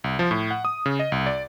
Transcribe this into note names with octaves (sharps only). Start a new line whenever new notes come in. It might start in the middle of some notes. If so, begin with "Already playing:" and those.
C2
F3
A2
F#5
D#6
C#3
D#5
C2
D5